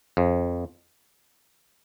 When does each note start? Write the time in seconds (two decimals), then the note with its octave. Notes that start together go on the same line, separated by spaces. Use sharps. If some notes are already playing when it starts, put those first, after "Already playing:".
0.17 F2